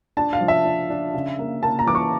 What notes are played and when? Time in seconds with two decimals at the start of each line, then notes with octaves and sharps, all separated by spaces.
0.17 D4 A5
0.33 F5
0.41 F3
0.48 E5
0.65 D4
0.90 D4
1.14 C#3
1.39 A#3
1.62 A#3 A5
1.79 A#5
1.87 E3 D6
1.95 C#6